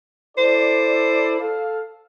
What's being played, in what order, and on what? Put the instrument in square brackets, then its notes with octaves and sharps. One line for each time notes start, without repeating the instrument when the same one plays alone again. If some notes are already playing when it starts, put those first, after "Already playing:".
[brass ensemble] E4 A4 D5 [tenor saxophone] C5
[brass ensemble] A4 F5